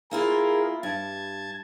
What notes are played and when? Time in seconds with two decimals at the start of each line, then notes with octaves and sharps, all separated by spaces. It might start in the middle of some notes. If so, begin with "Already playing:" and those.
0.11 A#3 E4 F4 G#4 A#4
0.83 G2 A5 G#6